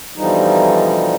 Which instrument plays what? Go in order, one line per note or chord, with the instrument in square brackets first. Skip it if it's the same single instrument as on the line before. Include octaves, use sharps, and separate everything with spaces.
[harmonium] B2 D3 E3 F3 G3 D#4